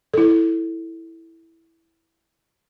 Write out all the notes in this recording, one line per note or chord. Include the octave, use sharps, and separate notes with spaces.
E4 A4